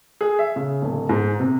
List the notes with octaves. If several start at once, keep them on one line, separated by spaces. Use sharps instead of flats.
G#4
E5
C#3
D1
G#2
C3